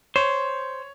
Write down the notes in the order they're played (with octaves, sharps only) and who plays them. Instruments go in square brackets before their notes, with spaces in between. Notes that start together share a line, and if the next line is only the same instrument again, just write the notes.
[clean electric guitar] C5 [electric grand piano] C#5